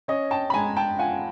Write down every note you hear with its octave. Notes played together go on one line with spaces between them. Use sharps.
C#4 C#5 D#5
G5 A5
B5
G#3 G#5 A#5
G5 A5
F4 F#5 G#5